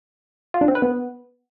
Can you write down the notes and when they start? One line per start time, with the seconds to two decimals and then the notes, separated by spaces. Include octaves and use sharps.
0.54 F4
0.61 D4
0.68 C4
0.75 B4
0.82 B3